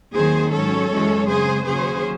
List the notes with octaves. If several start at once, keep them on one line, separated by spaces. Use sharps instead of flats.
D#2 D#3 F#3 C4 G#4 C5
G#2 F#3 C#4 A4 C#5
F#2 E3 G#3 C#4
C#3 G#3 C4 G#4 C5
D#2 C#3 F#3 C#4 G#4 C5